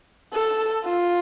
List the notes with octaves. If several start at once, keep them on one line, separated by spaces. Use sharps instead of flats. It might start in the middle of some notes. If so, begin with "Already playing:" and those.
A4
F4